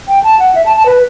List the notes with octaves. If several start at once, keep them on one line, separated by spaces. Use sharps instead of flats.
G5
A5
F#5
E5
A5
A5
B4